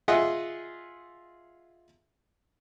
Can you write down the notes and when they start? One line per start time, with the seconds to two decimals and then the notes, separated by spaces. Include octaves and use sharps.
0.08 F4 G#4 D#5 E5 F#5